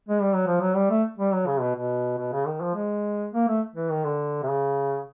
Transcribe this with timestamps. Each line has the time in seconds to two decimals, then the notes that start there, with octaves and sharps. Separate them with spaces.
0.09 G#3
0.21 G3
0.35 F#3
0.47 F3
0.61 F#3
0.75 G3
0.90 A3
1.19 G3
1.33 F#3
1.47 C#3
1.61 B2
1.76 B2
2.18 B2
2.33 C#3
2.47 D#3
2.61 F3
2.75 G#3
3.34 A#3
3.48 A3
3.76 E3
3.90 D#3
4.04 D3
4.43 C3
4.48 C#3